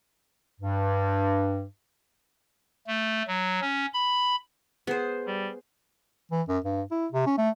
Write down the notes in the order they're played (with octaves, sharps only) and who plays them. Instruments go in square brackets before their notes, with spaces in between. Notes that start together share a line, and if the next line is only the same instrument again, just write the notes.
[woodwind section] G2
[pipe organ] A3
F#3
C#4
B5
[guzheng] B3 [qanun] G#4 C5
[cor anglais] G3
[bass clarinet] E3
F#2
G2
E4
C3
C#4
A3